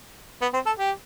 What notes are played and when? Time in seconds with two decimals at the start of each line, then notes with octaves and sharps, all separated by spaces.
0.42 B3
0.53 C4
0.66 A4
0.79 G4